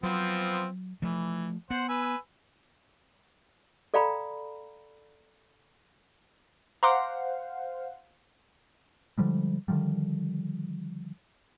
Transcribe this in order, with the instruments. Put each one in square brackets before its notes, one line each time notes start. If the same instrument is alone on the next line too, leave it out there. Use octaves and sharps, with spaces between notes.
[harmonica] F3 B3 C4 [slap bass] F#3
[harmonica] E3 [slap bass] F3 A3
[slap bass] B3 [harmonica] C5 F#5
[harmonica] B4 G#5 E6
[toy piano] A4 D5 F5 G5 A#5 B5
[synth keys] C5 F5 F#5 [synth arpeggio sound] A#5 C6 D6
[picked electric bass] D3 F3 G3 G#3
D3 D#3 F3 G3